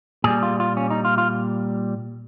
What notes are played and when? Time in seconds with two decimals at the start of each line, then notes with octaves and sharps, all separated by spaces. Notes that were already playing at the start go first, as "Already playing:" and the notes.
0.24 A#2 G3 G#4
0.43 F4
0.60 F4
0.77 C#4
0.90 D#4
1.05 F4
1.18 F4